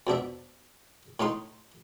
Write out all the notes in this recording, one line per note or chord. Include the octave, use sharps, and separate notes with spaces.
F2 B2 D4 E5
A2 A3 D#4 C6